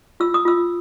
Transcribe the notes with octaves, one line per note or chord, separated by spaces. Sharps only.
F4 E6
D#6
F4 E6